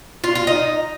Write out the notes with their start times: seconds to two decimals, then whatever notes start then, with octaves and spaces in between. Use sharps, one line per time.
0.24 F4
0.35 F4
0.47 D#4